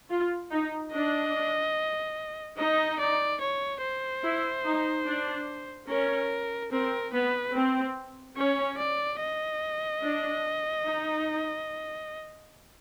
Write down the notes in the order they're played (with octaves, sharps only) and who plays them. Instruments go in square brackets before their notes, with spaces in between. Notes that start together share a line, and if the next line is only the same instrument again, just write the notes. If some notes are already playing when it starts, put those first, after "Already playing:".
[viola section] F4
D#4
[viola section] D4 [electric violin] D#5
[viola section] D#4 [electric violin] D#5
[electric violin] D5
C#5
C5
[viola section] E4
D#4
D4
[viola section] C#4 [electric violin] A#4
[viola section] C4 [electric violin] A#4
[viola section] B3 [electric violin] B4
[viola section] C4
[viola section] C#4 [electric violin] C#5
[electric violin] D5
D#5
[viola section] D4
D#4